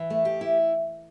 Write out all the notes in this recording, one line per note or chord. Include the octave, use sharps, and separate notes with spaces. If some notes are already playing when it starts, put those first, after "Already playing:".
Already playing: E3
A3
G4
E4